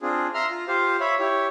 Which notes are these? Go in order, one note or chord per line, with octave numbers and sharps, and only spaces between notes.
C4 D4 F4 G#4
E5 A#5 C6 F6
F4
F4 G4 C5 F5
C#5 E5 B5
E4 G4 C#5